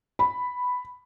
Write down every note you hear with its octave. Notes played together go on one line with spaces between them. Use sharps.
B5